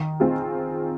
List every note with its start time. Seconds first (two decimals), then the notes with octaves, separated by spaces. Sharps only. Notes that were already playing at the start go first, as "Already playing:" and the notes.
Already playing: D#3
0.20 C4 F4 G#4